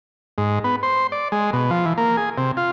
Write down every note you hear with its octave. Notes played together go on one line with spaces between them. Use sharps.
G#2
B3
C5
D5
G#3
B2
F3
E3
A#3
G#4
C3
F4